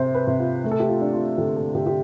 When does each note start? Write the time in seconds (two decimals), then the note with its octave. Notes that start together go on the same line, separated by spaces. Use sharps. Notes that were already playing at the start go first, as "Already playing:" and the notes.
Already playing: C3 C5 E5
0.15 B4
0.27 C3
0.39 F4
0.64 A3
0.71 A4
0.80 G4
0.88 F4
1.01 D4
1.13 F4
1.38 D3 G4
1.56 A4
1.75 D3 G4
1.86 G4